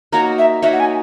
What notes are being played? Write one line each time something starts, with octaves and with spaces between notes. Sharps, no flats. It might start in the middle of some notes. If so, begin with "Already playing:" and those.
A#3 D#4 F#4 C#5 A#5
E5
A#3 D#4 F#4 C#5 E5
F#5
G#5